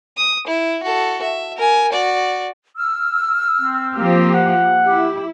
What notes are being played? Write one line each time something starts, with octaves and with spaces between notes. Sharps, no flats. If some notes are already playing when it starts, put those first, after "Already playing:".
D#6
E4
F#4 A4
E5
A#4 G#5
F#4 D5
E6 F6
C4
F3 A#3 G4
F#5
E4 G4